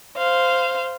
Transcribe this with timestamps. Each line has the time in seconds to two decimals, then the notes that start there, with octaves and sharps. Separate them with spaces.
0.17 C5 F5